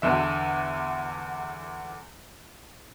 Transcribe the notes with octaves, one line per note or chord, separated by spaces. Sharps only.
E2 D3 E5